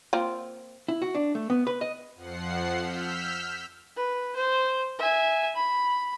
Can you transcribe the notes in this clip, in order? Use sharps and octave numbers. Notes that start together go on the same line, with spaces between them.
A#3 C4 F4
E4
F#4
D4
A3
B3
B4
D#5
F2 F3 F#5 C7
E6 F6 G6 B6
B4
C5
E5 G#5
B5